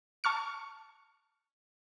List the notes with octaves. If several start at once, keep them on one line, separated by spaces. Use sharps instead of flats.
A5 C#6 F6 C#7